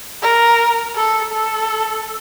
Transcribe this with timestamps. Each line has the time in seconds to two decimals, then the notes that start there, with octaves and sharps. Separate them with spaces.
0.22 A#4
0.95 A4
1.32 A4